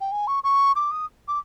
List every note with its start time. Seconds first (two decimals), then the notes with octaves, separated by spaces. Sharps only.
0.01 G5
0.12 G#5
0.27 C#6
0.44 C#6
0.76 D6
0.91 D#6
1.28 D6